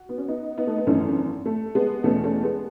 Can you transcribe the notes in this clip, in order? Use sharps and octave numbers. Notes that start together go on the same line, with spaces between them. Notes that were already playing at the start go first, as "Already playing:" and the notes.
Already playing: F#4
B3
C#4
B3 D#4
B3 D#4
A3
B3
G#1 F#2 E3 A3 C#4
A3
G#3 B3
E2 B2 A3 C#4
A3 C#4
G#3 B3